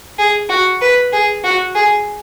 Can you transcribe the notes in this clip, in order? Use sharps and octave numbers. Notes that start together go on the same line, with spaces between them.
G#4
F#4
B4
G#4
F#4
G#4